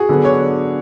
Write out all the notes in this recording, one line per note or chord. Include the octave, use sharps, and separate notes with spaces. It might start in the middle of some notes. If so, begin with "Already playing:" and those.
Already playing: F#4 G#4
D3 F#3 B3 D4
C#5